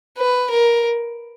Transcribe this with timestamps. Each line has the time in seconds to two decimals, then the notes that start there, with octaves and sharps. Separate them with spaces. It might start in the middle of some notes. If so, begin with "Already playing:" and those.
0.17 B4
0.50 A#4